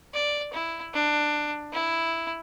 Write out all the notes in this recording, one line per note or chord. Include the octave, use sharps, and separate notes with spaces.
D5
E4
D4
E4